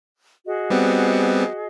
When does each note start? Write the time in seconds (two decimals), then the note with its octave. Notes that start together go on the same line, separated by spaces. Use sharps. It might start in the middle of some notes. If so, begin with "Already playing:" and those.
0.45 F#4 G#4 D#5
0.70 G3 B3 C4